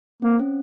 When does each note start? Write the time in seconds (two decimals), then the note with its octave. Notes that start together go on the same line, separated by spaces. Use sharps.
0.22 A#3 C4
0.39 C#4